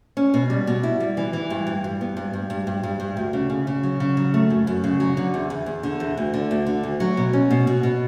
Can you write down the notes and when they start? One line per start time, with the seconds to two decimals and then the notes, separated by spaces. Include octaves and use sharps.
0.17 C#4
0.34 B2
0.50 G3
0.67 B2
0.83 E4
1.00 G3
1.17 E3
1.33 E3
1.50 G2
1.67 G2
1.84 G2
2.01 B3
2.17 G2
2.33 G2
2.50 G2
2.67 G2
2.83 G2
3.00 G2
3.17 D2
3.33 C#3
3.50 C#3
3.67 C#3
3.83 F#3
4.00 C#3
4.17 F#3
4.34 A3
4.50 F#2
4.67 F#2
4.84 C#3
5.00 F#3
5.17 D3
5.34 E2
5.50 E2
5.66 E2
5.83 D3
6.00 E2
6.17 D2
6.34 D3
6.51 D2
6.66 D3
6.83 D2
7.00 F#3
7.17 B2
7.33 C#4
7.50 B2
7.67 B2
7.83 B2